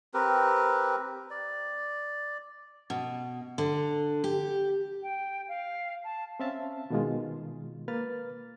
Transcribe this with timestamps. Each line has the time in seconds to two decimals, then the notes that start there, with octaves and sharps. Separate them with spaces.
0.14 C4 G4 A#4 B4
1.31 D5
2.90 B2
3.58 D3
4.24 G4
5.02 G5
5.48 F5
6.04 A5
6.40 C4 C#4 E5 F5 A5
6.90 B2 D#3 G#3 F4
7.88 A#3 B4 F6 A6